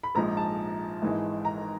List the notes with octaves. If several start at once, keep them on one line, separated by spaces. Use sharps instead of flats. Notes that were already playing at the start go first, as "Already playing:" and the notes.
B5
A#1 G#2 F3 G#3 A#5
A5
G#1 G#2 E3 G#3
A#5